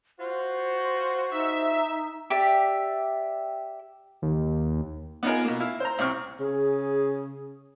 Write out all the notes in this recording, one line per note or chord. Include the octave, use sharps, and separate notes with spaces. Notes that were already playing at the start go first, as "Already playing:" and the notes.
F4 F#4 C5
D#4 E5
G4 D5 E5
D#2
B3 D#4 F4 G#4 A#4
B2 A#3
E4 F5
C5 A#5
C2 C4 C#6 F6
C#3 G#4